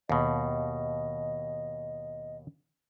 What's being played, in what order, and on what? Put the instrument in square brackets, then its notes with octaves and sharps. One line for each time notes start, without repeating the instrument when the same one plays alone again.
[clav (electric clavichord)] D#2 B2 [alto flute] D#5